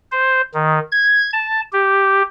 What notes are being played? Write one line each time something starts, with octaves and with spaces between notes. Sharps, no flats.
C5
D#3
G#6
A5
G4